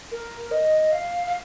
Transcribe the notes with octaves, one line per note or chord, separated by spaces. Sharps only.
A#4
D#5
F5
F5